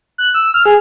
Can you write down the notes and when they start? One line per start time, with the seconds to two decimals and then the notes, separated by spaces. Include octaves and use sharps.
0.18 F#6
0.34 E6
0.54 F6
0.66 G#4